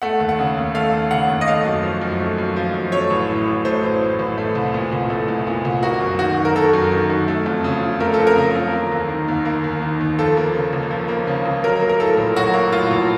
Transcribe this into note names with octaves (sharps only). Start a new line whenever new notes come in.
A3 F#5
D#2
F#5
C#3
D#2
A3 F5
D#2
C#3 F#5
D#2
D#5
A3 F5
F#2
F3
F#2
A3
F#2
F3
F#2
A3 C#5
A1
A2
A1
A3 C5
A1
A2
A1
A3
C2
A#2
C2
A3
C2
A#2
C2
A#3 F#4
F#2
D#3 F#4
F#2
A#4
A#3 A4
F#2
D#3
F#2
A3
F2
C#3
F2
A3 A#4
A4
F2
A#4
C#3
F2
A#3
D#2
D#3
D#2
A#3
D#2
D#3
D#2
F3 A4
A#3
C#3
C#2
F3
A#3
C#3
C#2
F#3 A#4
A#3
A#4
A2 A4
A#1
F#3 F#4
A#3
A2 F4
A#1